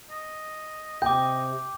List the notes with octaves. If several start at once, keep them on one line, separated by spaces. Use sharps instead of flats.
D#5
C3 G5 D6 G6